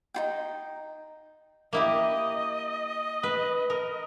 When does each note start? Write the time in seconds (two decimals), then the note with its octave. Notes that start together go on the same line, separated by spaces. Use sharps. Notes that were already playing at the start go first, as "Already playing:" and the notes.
0.14 D#4 F4 G5
1.73 A#3 E4 G4 D#5
3.23 B4
3.70 A#4